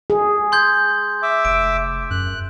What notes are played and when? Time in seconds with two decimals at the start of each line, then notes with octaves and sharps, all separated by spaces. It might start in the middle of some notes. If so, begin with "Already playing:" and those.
0.10 G#4
0.52 C6 G6 G#6
1.23 E5 D6 E6
1.45 F1 D7
2.11 F#2 F#6